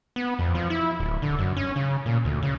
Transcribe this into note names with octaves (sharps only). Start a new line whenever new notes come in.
B3
F2
F3
E4
D1
D3
F#2
C#4
C#3
A#2
D2
C#3